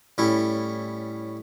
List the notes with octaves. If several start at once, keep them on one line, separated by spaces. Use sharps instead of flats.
A2 G3 C#4 E4